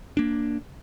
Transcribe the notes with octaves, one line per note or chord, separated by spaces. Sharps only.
A#3 D4